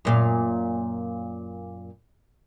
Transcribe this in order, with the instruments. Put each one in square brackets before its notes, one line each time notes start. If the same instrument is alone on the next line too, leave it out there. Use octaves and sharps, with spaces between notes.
[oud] F#2 A#2 F5